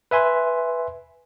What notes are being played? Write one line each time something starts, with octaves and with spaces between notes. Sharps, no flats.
B4 E5 G#5 C6